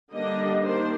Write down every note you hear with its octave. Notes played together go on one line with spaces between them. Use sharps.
D3 G3 A#3 D4 D#5
D#3 A#3 D4 C5